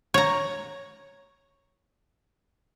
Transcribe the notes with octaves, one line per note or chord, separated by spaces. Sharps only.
C#5 A#5